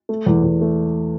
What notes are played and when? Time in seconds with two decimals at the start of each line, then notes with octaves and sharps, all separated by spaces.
0.09 A3
0.26 E2
0.43 E2
0.61 A3